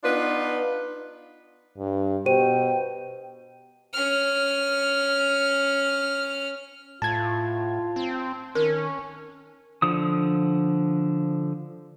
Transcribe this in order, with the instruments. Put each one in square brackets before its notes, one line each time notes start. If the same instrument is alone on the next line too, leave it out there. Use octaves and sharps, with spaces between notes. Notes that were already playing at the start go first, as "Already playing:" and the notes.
[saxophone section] B3 D4 D#4 F4 B4
[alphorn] G2
[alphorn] B2 [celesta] G4 C5 D#7 [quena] G5
[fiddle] C#4 F6
[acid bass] A2 [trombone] F4 [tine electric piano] A5 G#6
[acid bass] C4
[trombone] D#3 [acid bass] C#4 [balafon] A#4
[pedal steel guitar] D3 F3 D#6